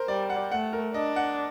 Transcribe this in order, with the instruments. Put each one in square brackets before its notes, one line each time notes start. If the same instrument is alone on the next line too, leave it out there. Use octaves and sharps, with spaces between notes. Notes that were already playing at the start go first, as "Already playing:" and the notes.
Already playing: [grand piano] A#4 C5
[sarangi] G3 [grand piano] D5
[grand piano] F#5
[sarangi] A3 [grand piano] F#5
[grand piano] A#4
[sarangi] D4 [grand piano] D#5
[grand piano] F#5